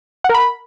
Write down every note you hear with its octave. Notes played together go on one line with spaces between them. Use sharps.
F#5
A#4
B5